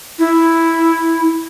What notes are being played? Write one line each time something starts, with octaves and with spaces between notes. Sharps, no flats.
E4